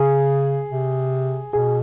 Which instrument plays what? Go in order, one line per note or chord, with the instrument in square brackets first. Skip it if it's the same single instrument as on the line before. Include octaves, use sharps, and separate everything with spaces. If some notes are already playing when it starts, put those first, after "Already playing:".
Already playing: [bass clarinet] C#3 [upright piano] G#4
[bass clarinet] C3
[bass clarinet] B2 [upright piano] G#4